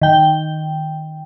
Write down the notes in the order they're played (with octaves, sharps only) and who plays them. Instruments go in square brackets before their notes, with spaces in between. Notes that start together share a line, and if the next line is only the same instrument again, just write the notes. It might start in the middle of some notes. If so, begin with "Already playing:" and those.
[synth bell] D#3 G5